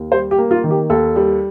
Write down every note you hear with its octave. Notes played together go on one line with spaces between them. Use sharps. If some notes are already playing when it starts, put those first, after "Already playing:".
Already playing: D#2
G3 C5
G4
A#3
F4
D#3
G4
D#2 A4
G3